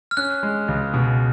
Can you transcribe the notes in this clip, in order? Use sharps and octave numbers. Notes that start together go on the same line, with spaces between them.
F6
C#4 F#6
G#3
C#2
B2